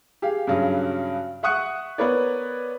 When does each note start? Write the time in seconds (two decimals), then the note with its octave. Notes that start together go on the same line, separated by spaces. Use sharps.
0.22 G4 G#4 F5
0.47 G2 C#3 F#3
1.43 E5 F#5 C#6 D#6 F#6 C#7
1.98 B3 A#4 B4 C#5 D5